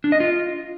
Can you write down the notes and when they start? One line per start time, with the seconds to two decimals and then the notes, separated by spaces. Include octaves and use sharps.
0.04 D4
0.12 D#5
0.20 F4